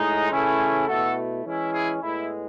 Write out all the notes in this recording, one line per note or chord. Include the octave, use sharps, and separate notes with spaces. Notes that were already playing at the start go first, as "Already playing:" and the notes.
Already playing: A2 G#3 D#4
C#3 E3 A3 C#4 E4
B2 A3 E4 F#4 A4
E3 G#3 C#4 E4
E4 G#4
A2 G#3 B3 E4